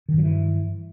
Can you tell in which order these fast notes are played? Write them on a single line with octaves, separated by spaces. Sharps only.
D#3 G2 F#3 E3